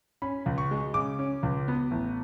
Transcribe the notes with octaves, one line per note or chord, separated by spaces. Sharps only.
C#4 B5
C#2
C#6
G#3
C#3 D6
C#4
C#2
B3
A1